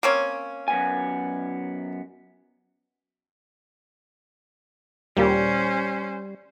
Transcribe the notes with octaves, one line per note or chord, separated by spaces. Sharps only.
A#3 C4 C#4
F#2 B3 G#5
D#2 A#2 G3 C#4 G4 C5